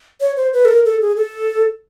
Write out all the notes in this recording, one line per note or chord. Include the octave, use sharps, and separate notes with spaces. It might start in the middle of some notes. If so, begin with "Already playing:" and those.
C#5
C5
B4
A4
A#4
A4
G#4
A4